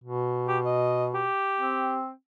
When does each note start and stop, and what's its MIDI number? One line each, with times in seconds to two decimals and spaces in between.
0.04 1.28 47
0.48 0.58 67
0.65 1.05 75
1.15 1.99 67
1.60 2.11 60